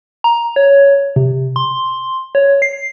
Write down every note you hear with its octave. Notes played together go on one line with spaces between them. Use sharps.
A#5
C#5
C3
C6
C#5
C7